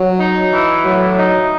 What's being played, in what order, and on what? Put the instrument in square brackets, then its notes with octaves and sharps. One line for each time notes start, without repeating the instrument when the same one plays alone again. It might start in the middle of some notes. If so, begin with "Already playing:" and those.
Already playing: [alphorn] F#3
[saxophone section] D#4
E3
[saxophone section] A2 [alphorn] F#3
[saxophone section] D#4